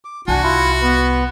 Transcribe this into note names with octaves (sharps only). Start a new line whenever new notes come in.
D6
C2 D4 F#4 F#5 G#5
E4 F4
B3 B4